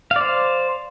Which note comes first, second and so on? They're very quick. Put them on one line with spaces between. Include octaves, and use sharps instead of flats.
F5 D5 C5